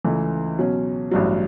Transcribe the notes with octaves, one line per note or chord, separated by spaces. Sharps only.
C#2 C#3 E3 A3
B2 F#3 C#4
A1 G2 F#3